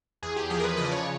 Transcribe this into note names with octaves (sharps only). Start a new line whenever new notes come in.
E2 G#4
G4
F3 G#4
A#4
B4
C#3 D#5
D5
C#5